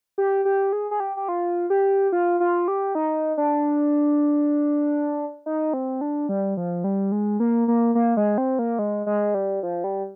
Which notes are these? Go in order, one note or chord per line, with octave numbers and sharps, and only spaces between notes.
G4
G4
G#4
G#4
G4
G4
F4
G4
F4
F4
G4
D#4
D4
D#4
C4
D4
G3
F3
G3
G#3
A#3
A#3
A#3
G#3
C4
A#3
G#3
G#3
G3
F3
G3